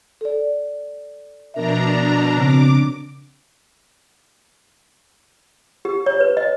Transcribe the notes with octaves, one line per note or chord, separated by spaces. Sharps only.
A4 D5
B2 F3 D4 A#4 E5 A#5
C#3 C4 D4 D6
G4
C#5
B4
D#5